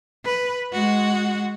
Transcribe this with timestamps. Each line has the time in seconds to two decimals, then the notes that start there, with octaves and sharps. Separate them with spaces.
0.25 B4
0.73 G#3 F#4